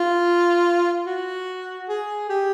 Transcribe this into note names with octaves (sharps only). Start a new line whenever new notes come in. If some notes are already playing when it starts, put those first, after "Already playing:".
Already playing: F4
F#4
G#4
G4